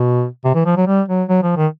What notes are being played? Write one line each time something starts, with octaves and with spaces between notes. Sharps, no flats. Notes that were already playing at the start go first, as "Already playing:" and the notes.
Already playing: B2
C3
E3
F3
F#3
G3
F#3
F#3
F3
D#3